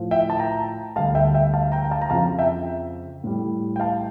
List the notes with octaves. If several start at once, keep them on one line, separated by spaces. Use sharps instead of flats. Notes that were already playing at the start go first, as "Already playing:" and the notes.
Already playing: A2 F3
E5 G5
A5
G5 A#5
D2 D3 G3 F5 A5
E5 G5
E5 G5
F5 A5
G5 A#5
G5
F5 A5
A#5
F2 C#3 F3 F5 A5
E5 G5
A2 G3
G5
F5 A5